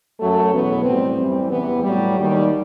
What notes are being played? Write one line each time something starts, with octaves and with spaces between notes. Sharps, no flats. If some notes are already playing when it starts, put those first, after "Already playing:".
F#2 F#3 A3
E2 B2 F#3 B3
A2 G3 C4
F#2 E3 G3 C4
E2 C3 E3 B3
A2 F#3 G3
D#2 D#3 G3